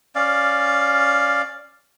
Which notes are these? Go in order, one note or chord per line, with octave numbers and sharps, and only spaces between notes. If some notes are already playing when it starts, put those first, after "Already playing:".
C#4 D5 F5